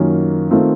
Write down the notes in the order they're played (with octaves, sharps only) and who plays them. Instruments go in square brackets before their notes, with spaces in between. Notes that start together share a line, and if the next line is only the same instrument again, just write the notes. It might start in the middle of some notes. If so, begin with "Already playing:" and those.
Already playing: [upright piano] F#2 D#3 A#3 C#4 F4
D#3 A3 C4 F4